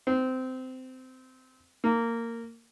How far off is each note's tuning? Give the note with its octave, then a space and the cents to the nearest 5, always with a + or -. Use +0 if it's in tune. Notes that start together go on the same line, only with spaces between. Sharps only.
C4 -20
A#3 -15